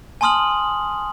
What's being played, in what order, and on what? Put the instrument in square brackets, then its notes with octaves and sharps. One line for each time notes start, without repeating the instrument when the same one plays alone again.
[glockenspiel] G#5 A5 C6 D#6 F6 F#7